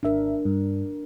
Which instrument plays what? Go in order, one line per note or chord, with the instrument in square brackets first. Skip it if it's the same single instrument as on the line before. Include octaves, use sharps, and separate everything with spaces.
[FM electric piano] G#1 E5 [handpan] D4 A#4
[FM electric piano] G2